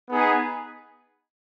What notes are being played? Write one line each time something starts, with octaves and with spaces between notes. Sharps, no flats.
B3 D#4 G#4 B4